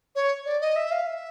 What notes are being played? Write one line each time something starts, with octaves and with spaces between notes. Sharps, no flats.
C#5
D5
D#5
E5
F5
E5